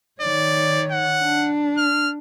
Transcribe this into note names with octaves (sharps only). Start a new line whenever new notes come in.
D#3 C#5 D5
F#5
D4
F6